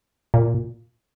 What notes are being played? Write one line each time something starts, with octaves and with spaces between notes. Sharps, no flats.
A#2